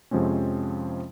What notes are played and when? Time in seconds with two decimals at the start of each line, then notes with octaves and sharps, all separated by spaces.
0.11 F2 C3 F3 G#3 C4 C#4